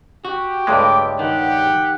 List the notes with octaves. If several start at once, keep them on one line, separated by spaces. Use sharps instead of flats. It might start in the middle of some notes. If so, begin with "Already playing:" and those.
F#4 G4
C#2 G2 G#3 A3 D6
D#3 G4 F#5